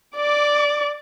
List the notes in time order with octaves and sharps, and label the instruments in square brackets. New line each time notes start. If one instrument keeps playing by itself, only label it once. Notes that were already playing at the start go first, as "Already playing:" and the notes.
[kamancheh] D5 D6